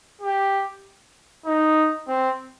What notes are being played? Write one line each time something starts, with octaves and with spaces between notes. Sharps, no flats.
G4
D#4
C4